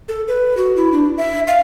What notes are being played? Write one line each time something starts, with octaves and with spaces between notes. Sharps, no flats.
A4
B4
F#4
E4
D4
E5
F5